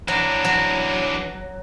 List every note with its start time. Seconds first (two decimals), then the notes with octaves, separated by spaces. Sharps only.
0.08 E3 F#3 D4
0.45 F#3